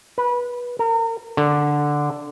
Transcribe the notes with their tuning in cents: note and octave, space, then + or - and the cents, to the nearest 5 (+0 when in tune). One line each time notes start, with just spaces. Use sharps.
B4 -20
A#4 -35
D3 +0